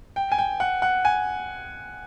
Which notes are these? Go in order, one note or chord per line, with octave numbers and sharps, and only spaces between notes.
G5
G#5
G5
F#5
F#5
G#5